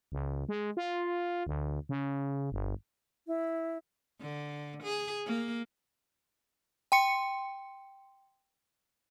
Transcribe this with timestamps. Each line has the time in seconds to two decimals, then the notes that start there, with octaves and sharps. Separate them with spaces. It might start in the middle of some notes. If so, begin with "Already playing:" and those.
0.12 C#2
0.49 G#3
0.77 F4
1.47 D2
1.89 C#3
2.52 G1
3.27 E4
4.21 D3
4.83 G#4
5.26 A#3
6.92 G5 C6 C#7